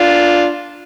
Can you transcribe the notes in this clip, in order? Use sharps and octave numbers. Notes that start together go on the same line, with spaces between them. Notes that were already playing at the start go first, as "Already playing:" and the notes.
Already playing: D4 F4